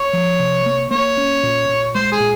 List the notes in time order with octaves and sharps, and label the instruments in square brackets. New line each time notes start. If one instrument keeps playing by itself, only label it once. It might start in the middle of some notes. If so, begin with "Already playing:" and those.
Already playing: [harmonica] C#5
[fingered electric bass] F3
C3
A#3
[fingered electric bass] A#3 [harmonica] C#5
[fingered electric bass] C#4
A#2
A#2
[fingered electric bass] G#3 [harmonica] C5
[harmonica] G#4
[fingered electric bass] A#2